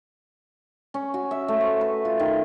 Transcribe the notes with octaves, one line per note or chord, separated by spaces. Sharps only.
C#4
F#4
E5
A3
C5
B4
F4
D#3